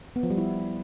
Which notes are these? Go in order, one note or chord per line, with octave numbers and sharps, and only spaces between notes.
B3
F3
G3
E4